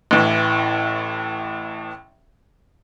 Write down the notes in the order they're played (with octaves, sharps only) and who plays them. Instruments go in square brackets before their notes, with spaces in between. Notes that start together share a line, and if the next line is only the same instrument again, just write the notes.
[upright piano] A1 A2 E3